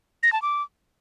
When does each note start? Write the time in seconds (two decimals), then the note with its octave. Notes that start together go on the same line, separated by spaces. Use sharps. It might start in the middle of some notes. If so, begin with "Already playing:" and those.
0.23 A#6
0.33 A5
0.42 D6